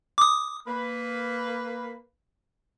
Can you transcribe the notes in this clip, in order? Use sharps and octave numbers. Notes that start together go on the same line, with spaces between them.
D6 D#6
A#3 B4